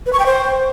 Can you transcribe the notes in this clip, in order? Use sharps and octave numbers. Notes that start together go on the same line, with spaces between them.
B4
C#6
G5
C5